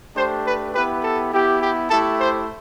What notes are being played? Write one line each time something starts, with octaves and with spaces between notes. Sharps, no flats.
A3 D4 G4 C5
B4
B3 E4 G4 B4
A4
B3 E4 G4
G4
A3 E4 G4 A4
C5